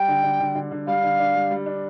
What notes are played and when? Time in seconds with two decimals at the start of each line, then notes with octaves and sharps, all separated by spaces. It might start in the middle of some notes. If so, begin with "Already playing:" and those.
Already playing: G3 G5
0.08 D3
0.23 D3
0.40 D3
0.55 D3
0.71 D3
0.87 G3 F5
1.03 D3
1.19 D4
1.35 G3
1.51 G3
1.66 D4